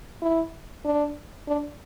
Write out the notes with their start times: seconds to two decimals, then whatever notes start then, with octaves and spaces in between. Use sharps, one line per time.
0.22 E4
0.85 D4
1.48 D4